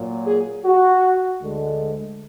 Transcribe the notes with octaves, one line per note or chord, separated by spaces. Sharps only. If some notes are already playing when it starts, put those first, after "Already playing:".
Already playing: A#2 F#3 A#3
G#4
F#4
D2 D3 G#3